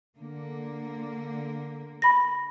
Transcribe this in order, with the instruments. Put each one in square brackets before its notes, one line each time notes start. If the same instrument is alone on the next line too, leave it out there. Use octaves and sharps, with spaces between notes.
[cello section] D3 A#3
[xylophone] B5 A#6